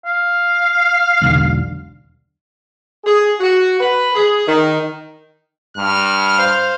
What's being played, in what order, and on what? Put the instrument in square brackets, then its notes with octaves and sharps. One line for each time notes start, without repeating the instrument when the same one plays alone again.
[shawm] F5
[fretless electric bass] E1 B1 D3
[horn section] G#4
F#4
B4
G#4
D#3
[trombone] G2 [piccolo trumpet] F6
[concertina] C5 F5